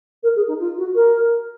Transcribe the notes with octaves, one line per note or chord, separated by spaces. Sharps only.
A#4
G#4
D#4
F4
F#4
A#4